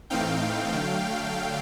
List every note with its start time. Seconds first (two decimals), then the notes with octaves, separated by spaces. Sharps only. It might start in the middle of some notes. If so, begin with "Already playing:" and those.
0.10 A2 E3 A3 C4 D#4 F5 G5
0.73 D3 F#3 A3